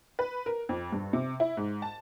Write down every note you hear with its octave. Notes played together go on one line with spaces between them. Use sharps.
B4
A#4
F2
G2
C3
E4
G#2
A5